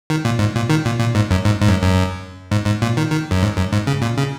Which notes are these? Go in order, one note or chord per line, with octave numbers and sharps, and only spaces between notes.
D#3
A#2
G#2
A#2
D#3
A#2
A#2
G#2
F#2
G#2
G#2
F#2
F#2
G#2
G#2
A#2
D#3
D#3
F#2
G#2
F#2
G#2
C#3
A#2
C#3